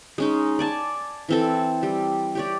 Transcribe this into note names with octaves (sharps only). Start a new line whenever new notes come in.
G#3 C#4 D#4
D5 G#5 A5
E3 C4 A4
G3
G4 C#5 D5